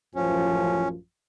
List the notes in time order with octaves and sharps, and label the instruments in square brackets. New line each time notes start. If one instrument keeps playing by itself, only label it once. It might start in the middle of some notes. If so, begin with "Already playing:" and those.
[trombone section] A1 F#2 F3 [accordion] C#4